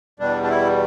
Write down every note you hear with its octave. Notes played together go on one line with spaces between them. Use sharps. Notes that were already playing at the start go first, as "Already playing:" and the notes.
E2 B2 G3 D4
D4
E4